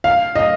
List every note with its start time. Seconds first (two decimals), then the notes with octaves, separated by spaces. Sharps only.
0.04 F5
0.36 D#5